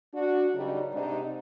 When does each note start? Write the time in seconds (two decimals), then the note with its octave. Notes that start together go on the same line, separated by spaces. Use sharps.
0.14 D4 F#4
0.54 G2 C#3 F#3 G3 D#4
0.93 G#2 C3 D4 D#4